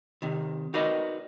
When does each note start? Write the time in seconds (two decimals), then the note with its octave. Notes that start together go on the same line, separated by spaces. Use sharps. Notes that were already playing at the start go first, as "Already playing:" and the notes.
0.22 C3 D#3
0.74 D#4 F#4 A#4 B4 D5 D#5